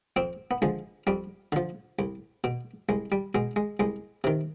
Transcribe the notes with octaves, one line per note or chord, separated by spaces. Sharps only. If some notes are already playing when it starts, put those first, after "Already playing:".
F2 C4
B3
D3 F3 G#3
F2 G3
D3 F3
C2
B2
C2 G#3
G3
B2 G#3
G#3
C2 G#3
C3 D#3